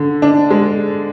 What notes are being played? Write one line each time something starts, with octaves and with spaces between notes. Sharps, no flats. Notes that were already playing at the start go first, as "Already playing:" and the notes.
Already playing: D3
D4
G#3